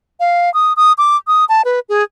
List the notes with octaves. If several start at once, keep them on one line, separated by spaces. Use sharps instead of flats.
F5
D#6
D#6
D6
D#6
A5
B4
G#4